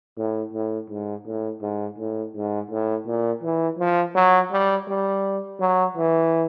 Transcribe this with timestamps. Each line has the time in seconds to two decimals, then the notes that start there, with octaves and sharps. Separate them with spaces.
0.18 A2
0.54 A2
0.90 G#2
1.26 A2
1.62 G#2
1.99 A2
2.35 G#2
2.71 A2
3.07 A#2
3.43 E3
3.79 F3
4.15 F#3
4.52 G3
4.88 G3
5.60 F#3
5.96 E3